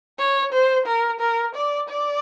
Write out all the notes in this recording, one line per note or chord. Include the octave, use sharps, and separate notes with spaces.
C#5
C5
A#4
A#4
D5
D5